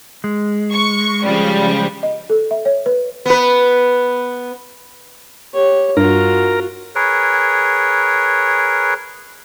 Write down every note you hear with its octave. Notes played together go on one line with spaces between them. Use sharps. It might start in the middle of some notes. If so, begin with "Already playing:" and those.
G#3
C#6
C#3 F3 G3
D#5
A4
E5
C#5
B4
B3 B4
G4 C#5
G2 F4 F#4 A#4
G#4 A#4 B4 C#5